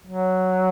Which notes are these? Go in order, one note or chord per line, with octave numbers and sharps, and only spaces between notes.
F#3